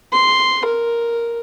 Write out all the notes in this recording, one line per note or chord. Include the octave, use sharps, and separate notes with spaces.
C6
A#4